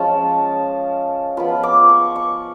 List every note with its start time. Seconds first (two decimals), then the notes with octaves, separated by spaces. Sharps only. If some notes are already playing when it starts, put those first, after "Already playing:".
Already playing: F3 G#3 C#4 A5
1.37 F3 B3 F4 B5
1.63 D6
1.89 C#6
2.16 C#6